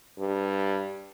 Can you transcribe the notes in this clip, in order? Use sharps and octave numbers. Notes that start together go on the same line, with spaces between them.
G2